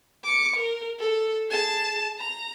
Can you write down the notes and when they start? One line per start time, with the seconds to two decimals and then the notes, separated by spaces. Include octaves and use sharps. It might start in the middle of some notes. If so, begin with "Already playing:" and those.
0.24 D6 C#7
0.56 A#4
0.99 A4
1.49 G#4 A5
2.19 A#5